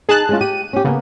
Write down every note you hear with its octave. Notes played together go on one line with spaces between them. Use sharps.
D#4 G#4 A5 F#6
G#3 C#4 F4
G4 D#7
C#4 G4
C#3 A#3 B3